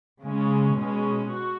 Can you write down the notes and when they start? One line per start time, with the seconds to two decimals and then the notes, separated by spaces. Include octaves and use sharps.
0.22 C#3 G#3 C#4
0.75 B2 G#3 C#4
1.28 F#4